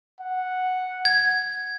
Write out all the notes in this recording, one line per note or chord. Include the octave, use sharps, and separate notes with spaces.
F#5
G#6